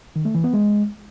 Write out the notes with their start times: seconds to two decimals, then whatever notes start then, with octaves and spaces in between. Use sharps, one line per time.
0.16 D#3
0.25 A3
0.35 E3
0.44 B3
0.53 G#3